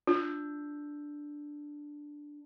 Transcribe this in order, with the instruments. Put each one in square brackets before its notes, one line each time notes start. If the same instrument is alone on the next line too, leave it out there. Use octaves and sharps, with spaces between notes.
[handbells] D4 [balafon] F4